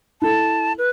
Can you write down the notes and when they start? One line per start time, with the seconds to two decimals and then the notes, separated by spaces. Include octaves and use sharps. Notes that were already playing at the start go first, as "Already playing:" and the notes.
0.22 E4 A4 A5
0.78 B4